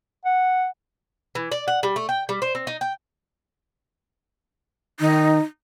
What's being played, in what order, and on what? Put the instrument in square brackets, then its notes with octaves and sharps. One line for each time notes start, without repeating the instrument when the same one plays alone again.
[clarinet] F#5
[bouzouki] E3
D5
F#5
G3
A3
G5
G3
C5
C4
D#4
G5
[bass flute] D#3 [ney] D#4